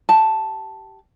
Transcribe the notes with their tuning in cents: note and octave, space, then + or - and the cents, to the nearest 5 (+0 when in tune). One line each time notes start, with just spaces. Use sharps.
G4 -15 A5 +0